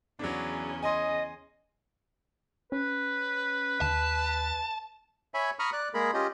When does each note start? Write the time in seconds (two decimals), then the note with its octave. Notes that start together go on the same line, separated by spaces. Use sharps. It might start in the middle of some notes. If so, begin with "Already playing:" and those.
0.19 E2 C#3 F#3 C#4 D4
0.83 D#5 G#5 C6
2.72 C#4 B4
3.81 D#2 A5
5.34 C#5 E5 G#5 B5
5.59 A#5 B5 C#6 D#6 F6
5.73 D5 F#6
5.94 G#3 A#3 G#4 A#4 B5
6.14 C#4 F4 G4 D#5